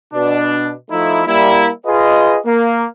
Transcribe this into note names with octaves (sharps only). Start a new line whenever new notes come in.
B2 D4
F3 A3 D#4 E4
G3 A#3 E4
F4 G#4 B4 D#5
A#3